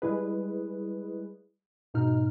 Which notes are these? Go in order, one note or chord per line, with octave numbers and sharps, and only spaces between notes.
G3 G#3 E4 G#4 B4
G#2 B2 D#4 F6